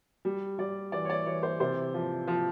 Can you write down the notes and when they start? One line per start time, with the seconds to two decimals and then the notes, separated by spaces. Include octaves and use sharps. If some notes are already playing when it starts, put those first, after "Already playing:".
0.25 G3
0.59 G3 D5
0.92 E3 D5
1.05 C#5
1.10 D5
1.26 E3 C#5
1.43 C5
1.60 C3 C5
1.94 F3
2.28 F3